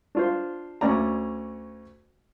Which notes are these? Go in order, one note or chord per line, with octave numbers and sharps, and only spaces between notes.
D4 F4 C5
D2 C#4 D5 A#5